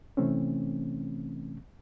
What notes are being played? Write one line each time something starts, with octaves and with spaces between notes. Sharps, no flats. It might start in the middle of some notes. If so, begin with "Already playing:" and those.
C3 E3 A3 C4 C#4